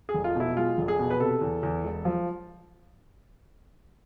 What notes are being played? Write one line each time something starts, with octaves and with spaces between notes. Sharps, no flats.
G#4
F1
F4
B2 E4
G#3 F4
F1
G#4
B2
B4
C3 A4
E2
E2
E1
F3